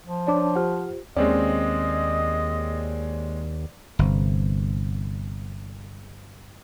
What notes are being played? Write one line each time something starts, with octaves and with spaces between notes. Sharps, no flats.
F3
D4 C#5 D5 D6
F4 G4 C5 F#5 F6
D#2 G#3 C4 C#4 D5 D#5
G1 C3